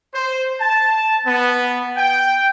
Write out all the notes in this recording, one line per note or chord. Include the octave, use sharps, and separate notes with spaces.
C5
A5
B3
G5